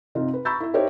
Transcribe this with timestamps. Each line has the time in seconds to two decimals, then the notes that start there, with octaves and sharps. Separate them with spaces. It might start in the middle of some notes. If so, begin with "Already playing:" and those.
0.15 C3 D#4 F4
0.34 B4
0.45 A#5 B5 C#6 E6 G6 A6
0.60 E4 E5
0.74 D#4 G4 A#4 C5 C#5 E5